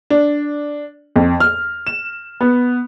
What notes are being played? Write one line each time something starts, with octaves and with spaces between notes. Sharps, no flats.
D4
F2
F6
E7
B3